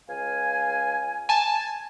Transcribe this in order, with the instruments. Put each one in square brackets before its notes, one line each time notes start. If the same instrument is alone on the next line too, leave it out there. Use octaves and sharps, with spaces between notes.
[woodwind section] C#2 F5 G#5
[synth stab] G#5 A5